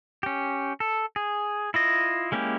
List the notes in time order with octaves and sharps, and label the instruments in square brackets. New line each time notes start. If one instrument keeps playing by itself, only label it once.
[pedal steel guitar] C#4 G4
A4
G#4
E4 F4 D#5
G#3 A#3 C#4 E4 G4